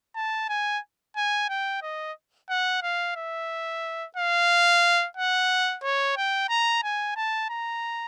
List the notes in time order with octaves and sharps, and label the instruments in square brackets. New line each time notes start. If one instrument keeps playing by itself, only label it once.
[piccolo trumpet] A5
G#5
G#5
G5
D#5
F#5
F5
E5
F5
F#5
C#5
G5
A#5
G#5
A5
A#5